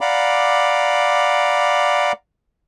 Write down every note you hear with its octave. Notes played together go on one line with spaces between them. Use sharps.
D5 F5 F#5 A#5 B5 D6